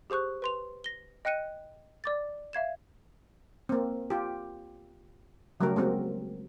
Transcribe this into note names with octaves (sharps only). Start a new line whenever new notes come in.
G4 G#4 C5 C#6 F#6
B4 C6 F7
A#6 G7
D#5 G5 F#6 C#7 D#7
D5 D6 A6
E5 F5 G#6 E7
A#3 C4
F4 G4
C#3 F#3 G3 A3 G4 A#4
G#3 A#3 C4 F#4 A#4